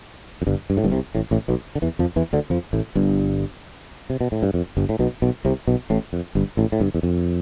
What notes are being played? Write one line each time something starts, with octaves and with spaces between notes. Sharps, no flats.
F2
G1 G2
G2
A2
G1 G2
C2 C3
A1 A2
A1 A2
B1 B2
D3
E2 E3
F2 F3
E2 E3
D2 D3
F2 F3
A1 A2
G1 G2
C3
B2
A2
G2
F2
G1 G2
A2
B1 B2
B1 B2
C2 C3
B1 B2
A1 A2
F2
G1 G2
A1 A2
A2
G1 G2
E2
F2